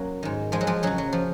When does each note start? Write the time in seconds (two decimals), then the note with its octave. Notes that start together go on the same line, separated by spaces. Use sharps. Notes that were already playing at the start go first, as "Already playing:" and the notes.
Already playing: F#2 F#3 A#3
0.23 G#2 D#3
0.52 F3 G#3
0.61 F#3
0.67 F3 G#3
0.83 F#2 C#3 F#3
0.98 F#3
1.13 F3